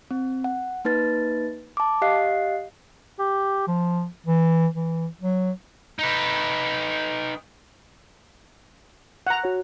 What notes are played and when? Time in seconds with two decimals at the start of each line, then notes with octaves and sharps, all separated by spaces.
0.11 C4
0.44 F#5
0.85 A#3 D#4 B4 A6
1.77 A5 D6
2.02 G4 D#5 F5 F#6 C7
3.19 G4
3.67 F3
4.26 E3
4.74 E3
5.21 F#3
5.99 D#4 B4
9.27 F#5 A#5
9.44 F#4 C#5